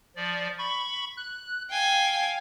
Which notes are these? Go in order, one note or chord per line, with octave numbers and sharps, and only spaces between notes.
F3 D5
B5 C#6
F#6
F5 G5 G#5